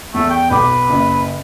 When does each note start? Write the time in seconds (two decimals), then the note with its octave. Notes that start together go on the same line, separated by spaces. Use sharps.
0.14 E2 A3
0.30 G5
0.50 B1 B4 D6
0.90 F#1